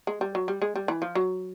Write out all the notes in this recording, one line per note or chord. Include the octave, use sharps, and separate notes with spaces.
G#3
G3
F#3
G3
G#3
G3
E3
F3
F#3